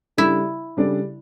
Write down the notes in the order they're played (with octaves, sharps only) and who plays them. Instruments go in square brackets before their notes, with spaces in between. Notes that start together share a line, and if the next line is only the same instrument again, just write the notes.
[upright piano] C#3 G3 D4 A4 D5 [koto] E4
[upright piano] C#3 G3 D4 A4 D5